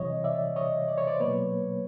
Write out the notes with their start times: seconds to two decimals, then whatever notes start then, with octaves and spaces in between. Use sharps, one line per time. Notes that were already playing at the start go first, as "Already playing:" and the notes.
Already playing: C3 E3 G3 C#5 D#5
0.24 D5 E5
0.56 C#5 D#5
0.88 D5
0.98 C#5
1.07 C5 D5
1.20 B2 F#3 A#3 B4 C#5